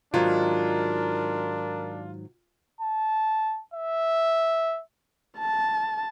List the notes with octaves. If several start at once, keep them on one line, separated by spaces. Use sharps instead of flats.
G#2 D#3 F#3 D4 F4 A#4
A5
E5
A5